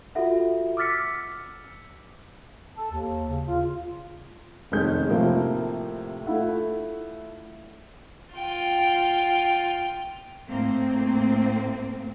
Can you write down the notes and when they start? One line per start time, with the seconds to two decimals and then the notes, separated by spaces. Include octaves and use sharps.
0.15 F4 F#4 A4 E5 F#5
0.77 D6 E6 F6 A6 B6 C#7
2.76 A4
2.92 D#2
3.29 C#3
3.47 F4
4.72 F1 D#3 G#3 C#4 G6
5.10 A2 C3 F3 A#3
6.26 A3 E4 F4 E5 F#5
8.34 F4 G5
10.48 A2 A#3 C4